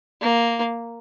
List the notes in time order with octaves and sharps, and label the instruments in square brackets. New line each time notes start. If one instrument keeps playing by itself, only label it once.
[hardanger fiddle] A#3